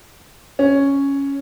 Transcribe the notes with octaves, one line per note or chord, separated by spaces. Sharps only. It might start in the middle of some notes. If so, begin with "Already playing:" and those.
C#4